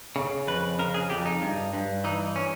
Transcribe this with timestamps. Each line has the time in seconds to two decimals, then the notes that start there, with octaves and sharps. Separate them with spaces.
0.16 C#3
0.48 F2 B4
0.79 C#3 A#4
0.94 G#4
1.10 F2 G4
1.26 D#4
1.42 G2
1.73 G2
2.04 E3 D#4
2.36 C#4